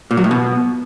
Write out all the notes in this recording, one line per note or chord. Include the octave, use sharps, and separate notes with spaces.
A#2
F#3
A2
B2